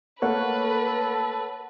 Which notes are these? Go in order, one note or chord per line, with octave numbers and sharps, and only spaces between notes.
A3 A#3 A4 B4 C#5 F#5